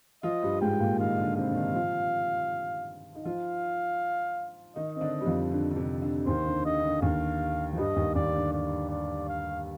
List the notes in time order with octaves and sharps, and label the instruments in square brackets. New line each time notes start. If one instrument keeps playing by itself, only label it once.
[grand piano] F3 F4 [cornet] D#5
[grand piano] G2 G3
[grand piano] G#2 G#3 [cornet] G5
[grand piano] A#2 A#3
[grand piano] D#3 D#4 [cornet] F5
[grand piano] D3 D4
[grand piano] C3 C4 [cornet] F5
[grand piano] D4
D#3 D#4
F3 F4
D#4
[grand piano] F3 F4 [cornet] F5
[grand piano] D#3 D#4 [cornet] D#5
[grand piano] C4
D3 D4
G3
F2 F3
D3
D3
C3
D3
[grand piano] D#2 D#3 [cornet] C5
[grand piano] D3
[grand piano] D3 [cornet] D#5
[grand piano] D3
[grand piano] D#2 D#3 [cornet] F5
[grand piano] F3
[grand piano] G2 G3 [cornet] D#5
[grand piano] D#2 D#3
[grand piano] D#2 D#3 [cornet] D5
[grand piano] D3
[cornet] D5
D5
F5